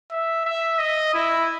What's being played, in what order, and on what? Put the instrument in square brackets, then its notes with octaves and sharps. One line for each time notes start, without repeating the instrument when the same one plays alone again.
[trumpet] E5
E5
D#5
E4